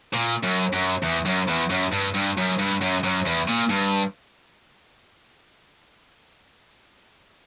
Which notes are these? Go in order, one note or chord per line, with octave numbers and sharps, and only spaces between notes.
A#2
F#2
F#2
E2
F#2
E2
F#2
G2
G2
F#2
G2
F#2
F#2
E2
A#2
G2